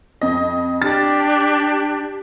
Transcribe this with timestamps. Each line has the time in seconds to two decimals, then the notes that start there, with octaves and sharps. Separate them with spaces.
0.21 F2 D#5
0.82 D4 G4 A6